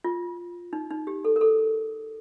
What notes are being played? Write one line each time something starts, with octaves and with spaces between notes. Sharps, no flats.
F4
D#4
D#4
G4
A4
A#4
A4